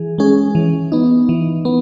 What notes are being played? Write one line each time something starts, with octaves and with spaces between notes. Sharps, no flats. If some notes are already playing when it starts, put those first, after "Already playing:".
Already playing: E3 G#4
G#3 C#4 G#4
E3
B3 D#4
E3
B3